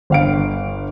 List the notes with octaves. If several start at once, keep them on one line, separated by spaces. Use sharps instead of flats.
G1 F5 D7